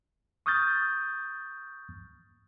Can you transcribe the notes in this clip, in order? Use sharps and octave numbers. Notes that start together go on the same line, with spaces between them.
C#6 D#6 F6 G6 A6